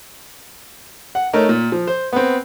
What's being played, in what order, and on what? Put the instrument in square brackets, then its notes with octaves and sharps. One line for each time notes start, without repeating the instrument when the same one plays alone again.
[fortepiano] F#5
A3 D#4 A#4 C#5
A#2
F3
C5
B3 C4